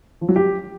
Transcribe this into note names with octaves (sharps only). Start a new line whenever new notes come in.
F3
F#3
G4